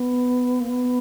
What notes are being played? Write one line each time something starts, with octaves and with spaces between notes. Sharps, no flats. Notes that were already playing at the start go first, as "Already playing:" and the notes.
Already playing: B3
A#3
B3